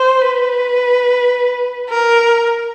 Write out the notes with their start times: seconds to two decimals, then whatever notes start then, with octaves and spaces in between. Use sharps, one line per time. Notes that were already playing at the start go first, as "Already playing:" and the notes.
Already playing: C5
0.22 B4
1.90 A#4